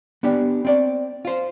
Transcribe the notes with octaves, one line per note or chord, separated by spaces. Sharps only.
B3 D4 G4
C4 D5
F4 C5